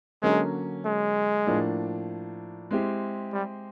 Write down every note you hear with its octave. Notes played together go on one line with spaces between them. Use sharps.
D3 F#3 G#3 A#3 C#4
G#3
A2 F3 A#3 D4
G#3 C4 E4 G4
G3